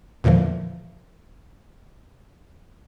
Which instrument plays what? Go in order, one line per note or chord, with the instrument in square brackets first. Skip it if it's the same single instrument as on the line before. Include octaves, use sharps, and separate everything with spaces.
[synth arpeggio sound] E2 A#2 D3 E3 F3